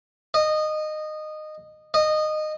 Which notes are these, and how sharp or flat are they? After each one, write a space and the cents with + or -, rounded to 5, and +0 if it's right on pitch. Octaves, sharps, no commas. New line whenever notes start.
D#5 -15
D#5 -15